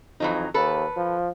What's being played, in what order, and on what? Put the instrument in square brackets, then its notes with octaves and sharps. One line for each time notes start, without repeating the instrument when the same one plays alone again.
[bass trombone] F2 [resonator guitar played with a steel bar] E3 F#3 D#4
[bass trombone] D#2 [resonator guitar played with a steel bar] A4 B4
[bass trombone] F3